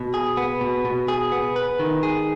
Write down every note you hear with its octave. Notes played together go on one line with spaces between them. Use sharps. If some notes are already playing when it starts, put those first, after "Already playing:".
Already playing: B2
G#4
B3
B2
B2
G#4
B3
B4
D#3
G#4